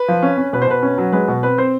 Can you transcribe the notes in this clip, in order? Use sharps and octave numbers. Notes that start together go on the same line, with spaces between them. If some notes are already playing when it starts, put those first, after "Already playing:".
Already playing: B4
F3
C#4
C#4
B2 B4
C5
B2 B4
C#4
F#3
G#3 B4
B2
C4 B4
C4 C5